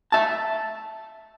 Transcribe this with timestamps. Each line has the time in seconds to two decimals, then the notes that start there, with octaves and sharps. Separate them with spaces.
0.12 E5 A5